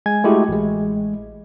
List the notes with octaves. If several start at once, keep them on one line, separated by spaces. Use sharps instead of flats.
G#3 G#5 G#6
G#3 A3 E4 F#4 G4
A1 G#3